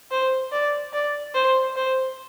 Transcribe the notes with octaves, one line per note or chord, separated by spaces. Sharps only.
C5
D5
D5
C5
C5